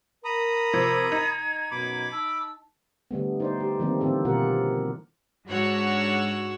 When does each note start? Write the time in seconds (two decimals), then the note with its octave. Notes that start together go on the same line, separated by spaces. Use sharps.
0.25 A#4 A#5 B5 D#6
0.73 C3 F3 G#6
1.12 D#4
1.71 F#2 B2 B5 D6
2.12 D#4 A5 E6
3.11 D3 G3 A3 B3
3.40 D#4 C5 D5
3.60 G4
3.80 D#3 F3 G3 A#3 C4
4.01 D3 E3 C4 A4
4.25 B2 D#3 F4 G4 A#4 F#5
5.47 G#2 D4 F#4 C#5 F#5 E6